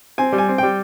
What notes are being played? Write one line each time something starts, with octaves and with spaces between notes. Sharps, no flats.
C4 G#5
G3
G#5
C4
G3 G5